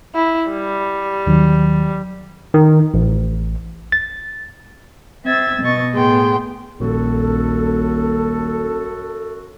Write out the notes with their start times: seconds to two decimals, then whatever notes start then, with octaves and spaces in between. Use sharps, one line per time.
0.15 E4
0.51 G3
1.26 D#2 D#3 F#3
2.54 D#3
2.94 A1
3.92 A6
5.25 C4 E5 E6 G#6 A6
5.62 B2 D#5 C#6 A6
5.94 A2 B3 G#4 G5 C6
6.80 D#1 A#1 F#2 F#4 A4